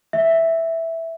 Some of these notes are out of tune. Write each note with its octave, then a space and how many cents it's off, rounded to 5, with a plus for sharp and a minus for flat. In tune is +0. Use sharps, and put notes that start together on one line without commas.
E5 -5